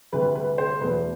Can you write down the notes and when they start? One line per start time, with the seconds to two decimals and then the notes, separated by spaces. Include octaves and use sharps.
0.12 D2 C3 G3 B4
0.35 B4
0.58 C5
0.81 E2 B2 A3 B4